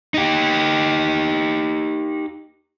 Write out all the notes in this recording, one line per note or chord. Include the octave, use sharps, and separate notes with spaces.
D#4 G4